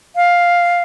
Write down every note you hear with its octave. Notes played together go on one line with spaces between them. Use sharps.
F5